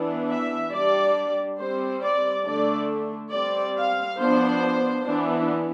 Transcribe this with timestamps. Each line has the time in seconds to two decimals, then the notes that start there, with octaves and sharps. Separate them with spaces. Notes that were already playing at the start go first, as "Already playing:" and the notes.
Already playing: E3 B3 D4
0.30 E5
0.73 G3 D4 D5
1.59 G3 C4 C5
2.03 D5
2.46 D3 A3 D4 D5
3.32 G3 C4 D5
3.76 F5
4.19 F3 B3 D4 C5
5.05 E3 B3 D4